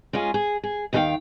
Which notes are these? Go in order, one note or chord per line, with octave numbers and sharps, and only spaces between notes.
G#3 C#4 F4 G#4
G#4
G#4
D#2 D#3 G4 A4 F5 G5